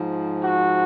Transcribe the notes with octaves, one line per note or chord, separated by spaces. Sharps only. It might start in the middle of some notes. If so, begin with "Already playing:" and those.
Already playing: G#2 F3
F#4